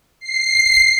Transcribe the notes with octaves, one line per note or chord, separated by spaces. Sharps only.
C7